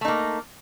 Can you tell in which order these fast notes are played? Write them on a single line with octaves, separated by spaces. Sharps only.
A3 D#4 A#3